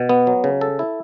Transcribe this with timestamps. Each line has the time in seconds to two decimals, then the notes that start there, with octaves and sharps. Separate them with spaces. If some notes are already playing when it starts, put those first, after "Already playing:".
Already playing: B2
0.09 B3
0.27 F#3
0.44 C#3
0.61 A4
0.79 E4